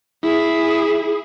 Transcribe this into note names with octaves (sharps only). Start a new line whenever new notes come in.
E4 G#4